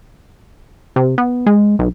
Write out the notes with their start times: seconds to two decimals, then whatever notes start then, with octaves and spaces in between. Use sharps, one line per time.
0.96 C3
1.18 B3
1.46 G#3
1.79 B1